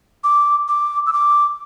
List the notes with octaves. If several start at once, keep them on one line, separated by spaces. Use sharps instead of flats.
D6
D6
E6
D6